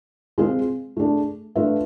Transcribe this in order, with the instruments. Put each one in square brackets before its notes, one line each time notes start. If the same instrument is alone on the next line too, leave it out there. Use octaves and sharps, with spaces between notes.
[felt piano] G#3 C4 F4 G#4
A3 D4 G#4
A3 D4 F4 B4 E5